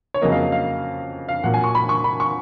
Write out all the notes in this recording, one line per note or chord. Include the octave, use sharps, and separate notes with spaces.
C#5
F2 C#3 F#3 A#3 D#5
F5
D#5
F5
F5
A#2 F#3 A#3 F#5
G#5
C#6
B5
C#6
B5
C#6